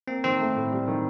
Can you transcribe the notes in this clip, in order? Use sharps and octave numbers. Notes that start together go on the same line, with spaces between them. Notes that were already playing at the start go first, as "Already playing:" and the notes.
A#3 C4
D#3 C4
A3
A2
G3
D#3